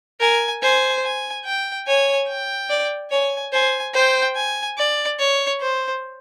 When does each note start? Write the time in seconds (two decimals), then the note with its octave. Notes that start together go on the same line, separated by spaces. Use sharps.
0.20 A#4 G#5
0.62 C5 G#5
1.04 G#5
1.45 G5
1.87 C#5 G#5
2.28 G5
2.70 D5
3.11 C#5 G#5
3.52 C5 G#5
3.94 C5 G5
4.35 G#5
4.78 D5
5.19 C#5
5.61 C5